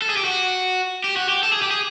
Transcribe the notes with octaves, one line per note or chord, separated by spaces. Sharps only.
A4
G#4
G4
F#4
G4
F#4
G4
A4
G#4
G4
G#4